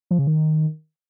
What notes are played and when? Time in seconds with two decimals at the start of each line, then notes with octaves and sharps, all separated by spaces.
0.11 F3
0.19 C#3
0.27 D#3